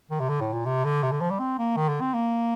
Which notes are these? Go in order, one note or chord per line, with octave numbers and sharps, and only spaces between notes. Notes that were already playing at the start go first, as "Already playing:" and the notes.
D#3
C3
D3
A2
A#2
C3
D3
C3
D3
F3
G3
C4
A#3
D#3
D3
C4
A#3